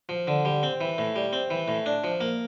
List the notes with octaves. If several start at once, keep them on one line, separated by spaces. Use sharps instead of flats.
F3
D3
G3
C4
E3
A2
G3
C4
E3
A2
D4
F3
A#3